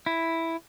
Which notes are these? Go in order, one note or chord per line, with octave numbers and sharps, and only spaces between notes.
E4